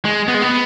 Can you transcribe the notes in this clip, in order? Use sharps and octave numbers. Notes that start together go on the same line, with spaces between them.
G#3
B3
G#3
B3